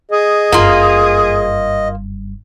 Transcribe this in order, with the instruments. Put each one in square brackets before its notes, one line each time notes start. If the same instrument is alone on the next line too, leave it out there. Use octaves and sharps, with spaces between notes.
[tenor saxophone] G#4 [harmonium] D#5
[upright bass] F#1 G2 [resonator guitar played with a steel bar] A#3 F4